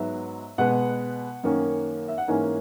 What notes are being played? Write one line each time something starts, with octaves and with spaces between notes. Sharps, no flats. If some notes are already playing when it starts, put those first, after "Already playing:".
Already playing: G#2 F#3 B3 E5
B2 G#3 B3 F#5
F#2 D#3 A#3 C#4
E5
F#5
G#2 E3 A#3 C#4 G#5